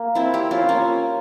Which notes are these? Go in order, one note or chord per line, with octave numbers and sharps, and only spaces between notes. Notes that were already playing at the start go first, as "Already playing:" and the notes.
Already playing: A#3
C4 E4
E4 G4
C#4 F4
A#3 C#4